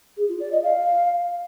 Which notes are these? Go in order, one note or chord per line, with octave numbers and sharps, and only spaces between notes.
G#4
F4
D5
D#5
F5